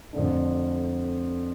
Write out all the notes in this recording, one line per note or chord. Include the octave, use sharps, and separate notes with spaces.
F2 D3 A3 D4